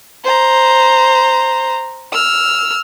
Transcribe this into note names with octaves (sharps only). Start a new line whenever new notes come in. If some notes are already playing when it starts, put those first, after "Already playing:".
C5 A#5
E6 F6